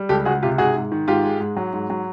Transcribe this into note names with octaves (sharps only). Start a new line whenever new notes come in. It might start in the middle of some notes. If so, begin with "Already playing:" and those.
Already playing: G3
C#2 G4 A4
C#2 F#4 G#4
C3 F4 G4
G#2 F#4 G#4
G#2
D#3
G#2 F4 G4
G#3
G#2
F#3
G#2
F#3